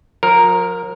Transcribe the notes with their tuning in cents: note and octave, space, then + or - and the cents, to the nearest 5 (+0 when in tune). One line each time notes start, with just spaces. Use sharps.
F3 +40 A#4 +0